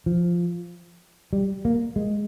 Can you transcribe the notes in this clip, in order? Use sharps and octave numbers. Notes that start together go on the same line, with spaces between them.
F3
G3
A#3
G#3